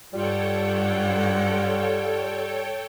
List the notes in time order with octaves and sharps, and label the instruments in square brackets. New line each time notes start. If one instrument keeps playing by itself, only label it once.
[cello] G2 F#5 [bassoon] G3 [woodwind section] F4 [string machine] A4 C#5 G5